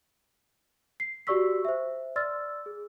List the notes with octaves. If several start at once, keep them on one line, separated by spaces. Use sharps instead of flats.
C7
F#4 G4 D5 C#6 E6 B6
C5 E5
D5 C6 E6 F6 A6
G#4